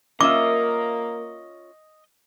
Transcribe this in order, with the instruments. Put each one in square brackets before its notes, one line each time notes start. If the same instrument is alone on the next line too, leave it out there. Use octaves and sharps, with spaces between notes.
[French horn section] A#3 A#4 [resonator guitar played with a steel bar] C#4 F4 E5 [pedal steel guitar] D#5 [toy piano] D6